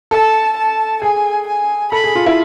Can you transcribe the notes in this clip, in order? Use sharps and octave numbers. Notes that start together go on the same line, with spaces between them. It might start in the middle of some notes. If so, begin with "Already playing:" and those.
A4 A5
A5
G#4 G#5
G#5
A4 B5
G#4
F4
E4